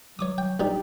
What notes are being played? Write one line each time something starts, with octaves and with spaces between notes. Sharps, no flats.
F#3 C#5 D6 D#6
G5
A#1 G3 D#4 G4